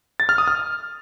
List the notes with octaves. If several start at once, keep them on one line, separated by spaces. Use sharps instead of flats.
A6
F6
D#6
F6